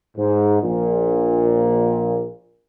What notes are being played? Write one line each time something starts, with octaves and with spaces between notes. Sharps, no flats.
G#2
A#1 A#2